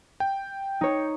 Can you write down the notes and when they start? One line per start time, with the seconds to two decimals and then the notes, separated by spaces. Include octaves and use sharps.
0.20 G5
0.81 D#4 C#5